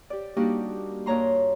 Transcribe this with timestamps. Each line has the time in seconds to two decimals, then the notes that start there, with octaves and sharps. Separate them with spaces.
0.10 G4 D5
0.37 G3 A#3 D4 D#4 F#4 G4
1.06 G2 A#3 C#5 A#5 C6